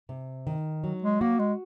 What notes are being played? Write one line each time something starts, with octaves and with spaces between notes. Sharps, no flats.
C3
D#3
F#3
G#3
A#3 F#4
G#3